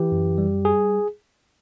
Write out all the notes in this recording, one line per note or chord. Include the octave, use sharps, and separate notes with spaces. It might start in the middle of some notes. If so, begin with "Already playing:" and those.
Already playing: E3 G4
F#2
G3
G#4